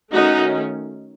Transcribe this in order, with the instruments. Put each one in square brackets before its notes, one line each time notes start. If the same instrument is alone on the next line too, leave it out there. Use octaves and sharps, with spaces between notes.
[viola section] D#3 A3 C#4 D#4 F#4